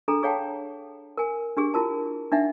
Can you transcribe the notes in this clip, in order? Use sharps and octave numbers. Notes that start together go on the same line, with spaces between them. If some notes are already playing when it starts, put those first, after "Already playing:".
D4 G#4 A4 A#5
G#4 C#5 F5 G5 A5
A#4 G#5
D4 G4 G#4
E4 F4 A#4 A5
D4 D#4 E5 F#5